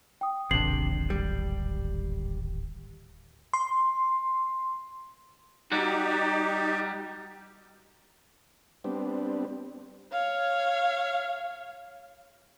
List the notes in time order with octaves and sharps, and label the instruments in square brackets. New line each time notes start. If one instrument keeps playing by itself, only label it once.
[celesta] G5 D#6
[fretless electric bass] D1 G#1 [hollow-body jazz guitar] C3 D4 [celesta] C7 F#7
[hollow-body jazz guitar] G3
[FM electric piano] C6
[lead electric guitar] G3 F#4 [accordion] D#4 G4
[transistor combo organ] G3 B3 C4 D4
[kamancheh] C#5 F5